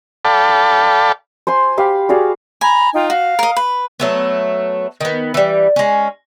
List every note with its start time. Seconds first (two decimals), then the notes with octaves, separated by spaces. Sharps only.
0.25 A4 D5 F5 G5 A5 B5
1.47 C5 G#5 C6
1.78 G4 F5 B5
2.09 F#4 G#4 D5 F5
2.61 G#5 A#5 B5
2.94 D#4 F4 G5
3.10 F#4 F5
3.39 A#4 D#5
3.57 B4
4.00 F#3 A3 B3
5.01 D#3 B3
5.34 E3 G3
5.76 G#3 C#4